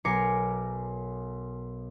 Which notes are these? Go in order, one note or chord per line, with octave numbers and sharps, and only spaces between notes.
B1 A#4 G#5 D6 C7 C#7